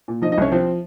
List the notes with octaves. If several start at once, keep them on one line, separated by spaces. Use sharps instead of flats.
A#2
F3 D#4 D#5
D#4 D#5
C2 C#4 C#5
F3 C4 C5